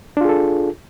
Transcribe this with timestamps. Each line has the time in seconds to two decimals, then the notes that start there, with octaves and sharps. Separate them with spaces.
0.17 D4
0.21 F4
0.25 G#4
0.29 A4